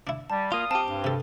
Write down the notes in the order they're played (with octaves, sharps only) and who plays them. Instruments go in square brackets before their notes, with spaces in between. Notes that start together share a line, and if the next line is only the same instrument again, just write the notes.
[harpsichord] D4 E4
[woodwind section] G3 [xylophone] A5
[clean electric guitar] A#3 F4 [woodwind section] F5 D#6
[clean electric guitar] C4 G4 [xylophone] A5
[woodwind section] G2
[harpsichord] C3 A4